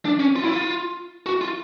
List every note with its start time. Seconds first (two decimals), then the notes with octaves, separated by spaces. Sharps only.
0.05 D4
0.20 C#4
0.36 F4
0.44 E4
0.50 F4
1.26 F#4
1.41 F4